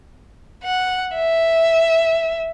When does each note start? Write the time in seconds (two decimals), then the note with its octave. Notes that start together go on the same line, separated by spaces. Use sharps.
0.64 F#5
1.16 E5